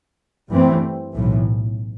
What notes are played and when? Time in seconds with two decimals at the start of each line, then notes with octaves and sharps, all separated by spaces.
0.49 G2 E3 A3 C4
1.12 B1 A2 E3